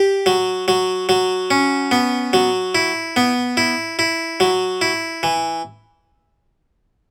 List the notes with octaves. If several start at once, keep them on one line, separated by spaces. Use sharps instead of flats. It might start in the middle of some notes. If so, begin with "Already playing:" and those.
Already playing: G4
F#3
F#3
F#3
C#4
B3
F#3
E4
B3
E4
E4
F#3
E4
E3